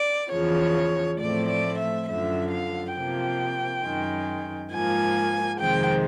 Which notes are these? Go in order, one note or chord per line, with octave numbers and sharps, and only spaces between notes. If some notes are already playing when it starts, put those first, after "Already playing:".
Already playing: D5
E2 C#3 F3 C#5
A2 F3 A3 C4 D5
D5
E5
F#2 D3 F3 E5
F5
C3 F3 A#3 G5
F#2 D#3 G#3
G#2 F3 A#3 G#5
F2 C3 D#3 G#3 C4 G5